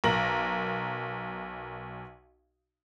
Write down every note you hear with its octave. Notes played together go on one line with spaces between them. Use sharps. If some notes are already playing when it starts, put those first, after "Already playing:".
B1 A#4 A#6 F#7